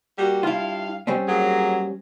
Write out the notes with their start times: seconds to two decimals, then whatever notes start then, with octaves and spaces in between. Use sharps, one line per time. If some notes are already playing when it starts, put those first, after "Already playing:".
0.18 G3 A#3 F#4
0.43 G2 E4 F4 F5
1.07 G3 C4 C#4
1.27 F#3 A#3 G#4